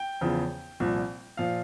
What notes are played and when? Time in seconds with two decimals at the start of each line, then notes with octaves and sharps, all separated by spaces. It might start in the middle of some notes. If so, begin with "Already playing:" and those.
Already playing: G5
0.21 E2 C#3 F3
0.80 C2 A#2 F3
1.37 A#2 F3 F5